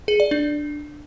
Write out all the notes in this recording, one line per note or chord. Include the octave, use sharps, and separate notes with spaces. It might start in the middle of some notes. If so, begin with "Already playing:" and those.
G#4
D5
D4